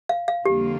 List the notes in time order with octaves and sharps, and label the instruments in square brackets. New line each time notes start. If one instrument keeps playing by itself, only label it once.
[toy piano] F5
F5
[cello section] F2 D3 G3 A#3 F4 [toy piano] G4